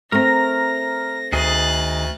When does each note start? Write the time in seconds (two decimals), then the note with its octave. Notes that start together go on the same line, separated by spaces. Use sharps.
0.12 A3 C4 A#4 A#5 A#6
1.33 D2 D#3 G#4 D#5 F#6 A6